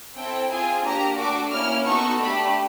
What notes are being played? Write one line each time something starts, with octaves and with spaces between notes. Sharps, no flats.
C4 E4 A4 G5
C4 F4 G#4 G#5
A#3 D4 G4 A#5
A3 D4 F#4 D6
A#3 C#4 E4 F6
B3 D#4 F#4 A4 C#6
A3 D4 G4 B5